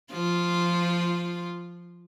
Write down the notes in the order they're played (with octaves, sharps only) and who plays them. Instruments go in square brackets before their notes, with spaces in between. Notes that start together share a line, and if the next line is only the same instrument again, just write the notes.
[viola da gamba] F3 F4